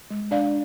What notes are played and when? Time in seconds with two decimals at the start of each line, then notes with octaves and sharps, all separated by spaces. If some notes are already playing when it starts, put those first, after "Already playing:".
0.11 G#3
0.31 D4 D5 F5